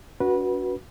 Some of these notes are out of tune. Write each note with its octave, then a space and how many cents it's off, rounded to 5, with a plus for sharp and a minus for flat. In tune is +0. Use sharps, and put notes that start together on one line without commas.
D4 -45 F#4 +0 B4 -20